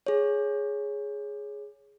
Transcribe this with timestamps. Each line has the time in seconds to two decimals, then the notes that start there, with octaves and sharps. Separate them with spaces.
0.07 G#4 C#5